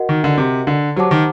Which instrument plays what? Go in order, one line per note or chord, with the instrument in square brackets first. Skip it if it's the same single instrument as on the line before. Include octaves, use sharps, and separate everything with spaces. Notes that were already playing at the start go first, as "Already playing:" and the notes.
Already playing: [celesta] F#4 A#4 D#5 F#5
[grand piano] D#3
D3
C3
D3
[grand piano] F#3 [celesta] G4 C5 F#5 A5 D6
[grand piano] D#3